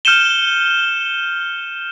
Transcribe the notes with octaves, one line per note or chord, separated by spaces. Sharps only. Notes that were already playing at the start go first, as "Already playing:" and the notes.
F6 G6 C#7 D#7 E7 G7